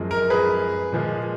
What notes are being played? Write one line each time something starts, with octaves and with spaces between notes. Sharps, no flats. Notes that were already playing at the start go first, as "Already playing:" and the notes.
Already playing: F#2 F3 G#3
A#4
G#4 B4
A#2 F3 G#3